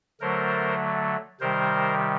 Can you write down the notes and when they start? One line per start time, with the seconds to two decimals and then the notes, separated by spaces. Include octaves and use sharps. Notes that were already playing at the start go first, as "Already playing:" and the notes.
0.21 D3 F#3 A3 A#4 C5
1.40 C3 D#3 G3 A#4 C5